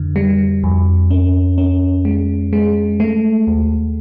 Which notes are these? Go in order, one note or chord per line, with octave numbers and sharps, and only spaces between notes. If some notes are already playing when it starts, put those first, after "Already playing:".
Already playing: F2 D3
G3
F2
C#4
C#4
G#3
G#3
A3
D#2